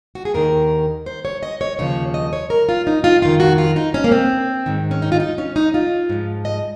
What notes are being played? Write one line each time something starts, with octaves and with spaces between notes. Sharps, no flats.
F#4
G#4
D#2 D#3 A#4
C5
C#5
D#5
C#5
D#2 C#3 F3 C#5
D#5
C#5
A#4
F4
D#4
F4
F2 D#3 F4
F#4
F4
D#4
C#4
A#3
C4
G#2 D#3
C#4
D#4
F4
D#4
C#4
D#4
F4
G#2 F3
D#5